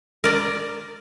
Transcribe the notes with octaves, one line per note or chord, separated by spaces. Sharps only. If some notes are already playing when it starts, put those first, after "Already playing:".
A#4 D5 A#5